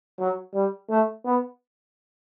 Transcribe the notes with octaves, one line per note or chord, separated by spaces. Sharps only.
F#3
G3
A3
B3